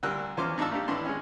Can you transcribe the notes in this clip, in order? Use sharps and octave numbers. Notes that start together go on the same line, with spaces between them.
D2 A#2 G3 A#4 E6 F#6
E2 F3 C#4 C6 D6 F6
G#2 D4 D#4 F4 A5 E6
A3 A#3 D4 G4
D#2 A2 E3 D4 C6
G#3 C#4